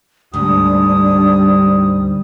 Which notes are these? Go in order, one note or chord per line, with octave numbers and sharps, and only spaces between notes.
D2 G#2 G3 D4 D#6